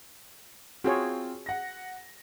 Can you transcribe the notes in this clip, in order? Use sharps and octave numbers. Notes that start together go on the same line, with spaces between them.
C4 F4 F#4 G#4 C#5
F#5 A#6